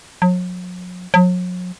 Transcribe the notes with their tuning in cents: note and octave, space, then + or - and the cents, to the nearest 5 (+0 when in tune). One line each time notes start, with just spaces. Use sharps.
F#3 -40
F#3 -40